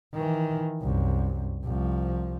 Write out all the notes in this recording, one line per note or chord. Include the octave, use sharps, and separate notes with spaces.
D#3 E3
C2 F#2
C2 F3